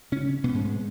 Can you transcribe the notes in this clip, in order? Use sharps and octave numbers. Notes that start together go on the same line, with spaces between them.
C#3 C#4
B2 B3
G#2 G#3
G#3